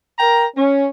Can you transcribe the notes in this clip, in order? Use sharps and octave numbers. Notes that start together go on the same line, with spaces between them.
A#4 G5 A#5
C#4